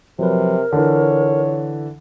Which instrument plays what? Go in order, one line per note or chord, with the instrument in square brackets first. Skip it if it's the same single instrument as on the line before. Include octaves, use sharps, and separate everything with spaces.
[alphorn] C3 [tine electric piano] F3 F#3 B4 [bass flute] A#4
[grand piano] D3 E3 [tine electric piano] F4 [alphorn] C#5